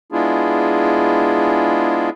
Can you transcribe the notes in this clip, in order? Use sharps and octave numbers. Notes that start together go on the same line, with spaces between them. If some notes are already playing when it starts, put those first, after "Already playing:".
G#3 B3 D4 E4 F4 G#4